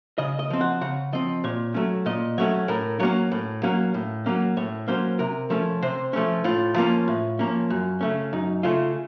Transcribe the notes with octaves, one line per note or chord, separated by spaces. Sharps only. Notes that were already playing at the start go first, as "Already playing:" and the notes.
C#3 D#5
D#5
F3 C4
F#5
C#3 F#5
F3 C4 D#5
A#2 C#5
F#3 A3 C#4
A#2 D#5
F#3 A3 C#4 C#5
A2 A#4
F#3 A#3 C#4 C#5
A2
F#3 A#3 C#4
A2
F#3 A#3 C#4
A2 C#5
F#3 A#3 C#4 C5
C3 A#4
F3 A3 C#4
C3 C5
F3 A3 C#4
A2 F4
F3 A#3 C#4 F4
A2
F3 A#3 C#4
F#2
C#3 A3 C#4
F#2 D#4
C#3 A3 C#4 F4